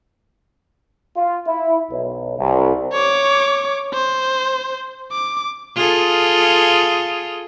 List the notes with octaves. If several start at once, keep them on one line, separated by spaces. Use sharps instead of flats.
F4
E4
B1
C2
C#5 D6
C5
D6
F4 G#4 A4